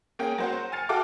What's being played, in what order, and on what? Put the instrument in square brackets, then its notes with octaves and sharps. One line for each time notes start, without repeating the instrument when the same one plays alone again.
[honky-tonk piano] A#3 C#4 G#4 G5
F#3 A#3 C5 F#5
G#5 F6 A6 C#7
F#4 A4 F5 G5 D6